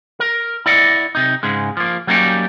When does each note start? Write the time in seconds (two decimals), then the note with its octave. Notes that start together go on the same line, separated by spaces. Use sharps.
0.20 A#4
0.66 E4 D5 D#5 F#5
1.15 C3 D#4
1.43 G#2 C#3 G#3
1.77 F3 A#3
2.07 F#3 G3 A#3 C#4 D#4 G4